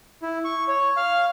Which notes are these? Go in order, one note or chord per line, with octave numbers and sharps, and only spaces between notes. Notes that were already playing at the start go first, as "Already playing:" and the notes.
E4
C#6
C#5
F5